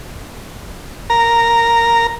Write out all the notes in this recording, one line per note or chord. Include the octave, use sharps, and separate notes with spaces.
A#4 A#5